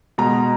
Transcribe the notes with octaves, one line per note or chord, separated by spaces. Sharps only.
B2 G#3 A#5